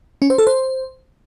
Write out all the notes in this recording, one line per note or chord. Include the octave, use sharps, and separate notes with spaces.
C#4
C5
A4
C5